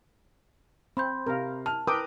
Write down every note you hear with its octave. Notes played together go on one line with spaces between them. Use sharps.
C4 B5 C6 G6
C3 A#4 F5
A5 F6
A#4 B4 G5 D6 D#6